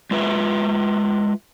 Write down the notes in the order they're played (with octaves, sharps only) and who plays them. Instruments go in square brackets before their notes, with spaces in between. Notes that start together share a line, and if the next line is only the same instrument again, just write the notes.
[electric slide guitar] G#3 F4 B4 E5